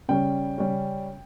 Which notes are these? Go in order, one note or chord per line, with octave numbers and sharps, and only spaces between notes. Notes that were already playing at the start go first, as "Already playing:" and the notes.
C#3 G3 C#4 G5
C#3 G3 C#4